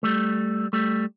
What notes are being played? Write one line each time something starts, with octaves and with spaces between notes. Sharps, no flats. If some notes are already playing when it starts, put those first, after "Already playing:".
G3 A3
G3 A3